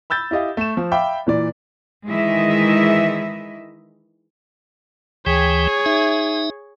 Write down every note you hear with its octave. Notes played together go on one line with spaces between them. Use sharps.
B5 E6 G6 A6
E4 G4 D#5 F5
A3 E7
F3
E5 F5 G5 B5 D6
A#2 E3 D5
D#3 E3 G#3 E4 D#5 E5
D2 E3 G#4 C#5 G5
D#4 E5